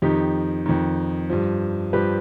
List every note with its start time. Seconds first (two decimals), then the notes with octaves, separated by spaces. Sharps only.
0.02 F2 D#3 D#4 G4
0.66 F2 D#3
1.30 G2 F3
1.93 G2 F3 G4 B4